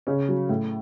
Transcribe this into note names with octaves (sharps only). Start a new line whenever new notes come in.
C#3 C#4
F#3
A2